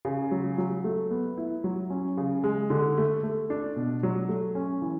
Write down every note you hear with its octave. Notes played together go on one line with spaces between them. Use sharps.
C#3
F#3
F#3
A3
B3
E4
F#3
C#4
C#3
G#3
D3
A3
A3
D4
B2
F#3
A3
C#4
E3